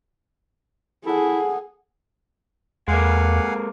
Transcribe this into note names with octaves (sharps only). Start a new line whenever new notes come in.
E4 G#4 A4 F#5
E2 G#3 A#3 F5 F#5 G#5